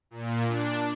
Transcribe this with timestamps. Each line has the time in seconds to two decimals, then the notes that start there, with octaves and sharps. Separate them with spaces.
0.11 A#2
0.48 D4